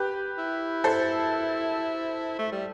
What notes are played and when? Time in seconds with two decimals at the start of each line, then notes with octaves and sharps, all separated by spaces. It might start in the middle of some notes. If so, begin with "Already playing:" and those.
Already playing: G4 B4
0.38 E4
0.84 A4 C5
2.39 A3
2.52 G3